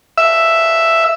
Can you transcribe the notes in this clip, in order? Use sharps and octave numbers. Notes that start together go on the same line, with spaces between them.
E5